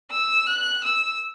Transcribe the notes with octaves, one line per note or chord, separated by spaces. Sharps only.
E6
F#6
E6